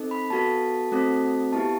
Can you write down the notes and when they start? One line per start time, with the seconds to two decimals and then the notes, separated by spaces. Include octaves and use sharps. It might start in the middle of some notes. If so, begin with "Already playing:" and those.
Already playing: C4 D#4 A4
0.11 B5
0.30 B3 F#4 A4 A5
0.92 A3 C4 F#4 A4
1.52 B3 E4 G4 A5